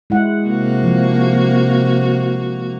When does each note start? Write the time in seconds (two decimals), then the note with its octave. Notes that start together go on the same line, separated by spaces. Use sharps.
0.10 G#3 E4 F#5
0.47 C3 A#3 F#4
0.83 F3